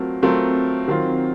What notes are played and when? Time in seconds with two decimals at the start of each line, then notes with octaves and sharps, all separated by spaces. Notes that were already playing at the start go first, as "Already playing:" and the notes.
Already playing: F#3 A3 C4 F4 A#4
0.22 F#3 A3 C4 F4 A#4
0.88 D#3 F#3 C4 F4